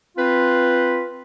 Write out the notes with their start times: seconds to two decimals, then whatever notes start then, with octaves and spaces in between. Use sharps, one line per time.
0.17 C4 F4 B4